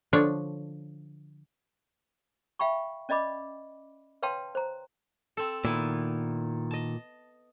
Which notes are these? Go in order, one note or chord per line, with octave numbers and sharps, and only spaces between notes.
D3 F3 D4 C#5
E5 F5 G5 B5 C#6
C#4 D5 D#5 B5 D6
B4 C#5 F5 G5 A5 C6
C5 A#5
C4 A4
A#2 D#3 B3 E4
D#5 A5